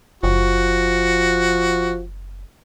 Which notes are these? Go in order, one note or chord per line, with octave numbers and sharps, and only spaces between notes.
F#1 F3 F#4